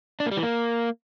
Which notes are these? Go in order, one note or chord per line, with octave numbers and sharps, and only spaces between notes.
D4
A#3
G3
E3
A#3